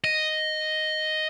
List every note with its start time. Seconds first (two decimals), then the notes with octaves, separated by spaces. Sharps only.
0.04 D#5